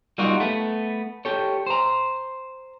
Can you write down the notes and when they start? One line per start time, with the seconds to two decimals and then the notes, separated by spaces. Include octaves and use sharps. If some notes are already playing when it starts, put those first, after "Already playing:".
0.18 G3 A#3 D#4 F4 F#4
0.40 A3 B3
1.25 G4 A4 C#5
1.66 C5 A#5